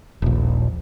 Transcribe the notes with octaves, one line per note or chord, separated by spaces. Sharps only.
D#1 A#1